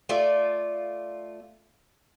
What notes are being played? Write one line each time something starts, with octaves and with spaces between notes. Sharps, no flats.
A3 F4 D5